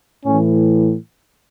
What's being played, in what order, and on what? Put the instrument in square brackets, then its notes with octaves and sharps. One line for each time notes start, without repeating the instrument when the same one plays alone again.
[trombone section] A2 E3 C#4